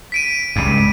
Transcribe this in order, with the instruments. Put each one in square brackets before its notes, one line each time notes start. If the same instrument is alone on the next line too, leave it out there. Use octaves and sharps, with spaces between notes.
[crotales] B6 D7 D#7
[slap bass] C#2 G2